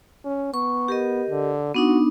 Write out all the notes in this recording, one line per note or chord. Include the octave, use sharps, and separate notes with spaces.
C#4
B3 C#6
G4 A#4 D#5
D3
B3 D4 D#4 F#4